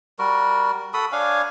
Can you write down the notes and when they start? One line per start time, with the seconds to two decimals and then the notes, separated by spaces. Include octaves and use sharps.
0.19 G3 F#4 A#4
0.94 F#4 A4 B5 D#6
1.12 D4 C#5 F5 G#5